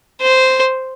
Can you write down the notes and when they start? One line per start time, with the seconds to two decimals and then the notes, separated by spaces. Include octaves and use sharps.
0.22 C5